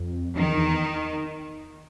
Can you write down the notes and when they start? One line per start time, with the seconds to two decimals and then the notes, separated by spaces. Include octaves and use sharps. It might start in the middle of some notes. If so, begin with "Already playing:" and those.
Already playing: F2
0.35 F2 D#3
0.43 E2
0.57 E2